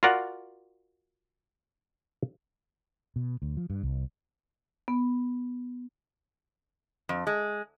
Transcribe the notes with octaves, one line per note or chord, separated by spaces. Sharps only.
F4 F#4 A#4 D5 F#5
B2
D2
F3
G2
C2
B3
F2
G#3